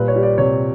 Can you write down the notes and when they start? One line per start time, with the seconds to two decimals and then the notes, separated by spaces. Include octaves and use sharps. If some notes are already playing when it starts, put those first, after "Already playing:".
Already playing: A#2 G3 B4
0.08 C#5
0.16 G3
0.23 D5
0.38 C3 C#5